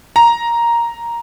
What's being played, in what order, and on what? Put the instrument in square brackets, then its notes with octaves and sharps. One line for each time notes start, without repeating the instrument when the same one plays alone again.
[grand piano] A#5